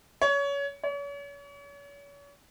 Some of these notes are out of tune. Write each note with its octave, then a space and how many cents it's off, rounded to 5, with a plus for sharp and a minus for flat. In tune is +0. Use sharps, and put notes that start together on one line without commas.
C#5 +25
C#5 +40